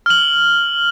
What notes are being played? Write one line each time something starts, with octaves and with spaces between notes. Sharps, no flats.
F6 F#7